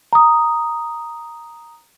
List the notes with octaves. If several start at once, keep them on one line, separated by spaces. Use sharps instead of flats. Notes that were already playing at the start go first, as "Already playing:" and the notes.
A#5 D#6